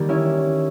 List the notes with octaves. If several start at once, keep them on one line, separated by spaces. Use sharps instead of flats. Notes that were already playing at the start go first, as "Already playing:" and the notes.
Already playing: D#3 G3 A#3
C#4 E4